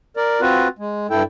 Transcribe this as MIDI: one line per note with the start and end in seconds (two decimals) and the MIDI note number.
0.17 0.41 70
0.17 0.41 74
0.41 0.68 60
0.41 0.68 65
0.41 0.68 66
0.41 0.68 71
0.79 1.07 56
1.10 1.23 43
1.10 1.23 64
1.10 1.23 69
1.10 1.23 79